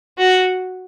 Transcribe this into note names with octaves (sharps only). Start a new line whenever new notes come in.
F#4